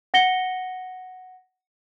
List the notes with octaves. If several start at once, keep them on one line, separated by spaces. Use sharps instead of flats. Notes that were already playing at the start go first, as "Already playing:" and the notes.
F#5 A#6 C#7 G7